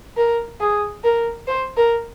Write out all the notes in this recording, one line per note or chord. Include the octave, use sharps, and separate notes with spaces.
A#4
G#4
A#4
C5
A#4